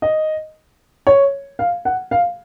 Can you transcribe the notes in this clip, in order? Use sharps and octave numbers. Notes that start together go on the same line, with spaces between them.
D#5
C#5
F5
F#5
F5